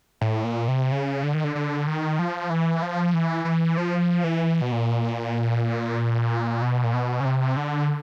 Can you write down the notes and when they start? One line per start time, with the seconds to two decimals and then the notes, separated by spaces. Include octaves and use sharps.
0.21 A2
0.44 A#2
0.68 C3
0.92 C#3
1.23 D3
1.34 D#3
1.44 D3
1.55 D3
1.87 D#3
2.19 F3
2.50 E3
2.82 F3
3.14 E3
3.45 E3
3.77 F3
4.24 E3
4.61 B2
4.72 A#2
6.62 B2
6.84 A#2
6.93 B2
7.20 C#3
7.25 C3
7.56 D3